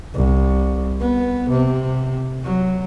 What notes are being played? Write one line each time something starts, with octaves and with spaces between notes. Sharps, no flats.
C2
B3
C3
F#3